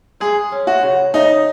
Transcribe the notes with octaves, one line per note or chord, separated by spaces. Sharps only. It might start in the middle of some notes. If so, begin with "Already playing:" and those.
G#3 G#4
C#4
F#4
C#3
C#3 D#4